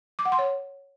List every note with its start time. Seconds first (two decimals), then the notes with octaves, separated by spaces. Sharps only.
0.19 D6
0.25 F#5
0.32 C6
0.39 C#5